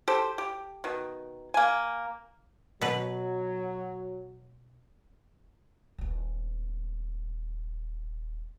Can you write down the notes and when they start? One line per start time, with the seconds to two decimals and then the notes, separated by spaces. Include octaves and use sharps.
0.08 G4 A4 C5
0.38 G4
0.84 B2 D#3
1.54 A#3 G#5
2.81 B2 F#3 B4
5.98 D#1 B3